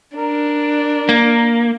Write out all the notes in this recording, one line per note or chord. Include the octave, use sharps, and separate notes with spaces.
D4 A#4
A#3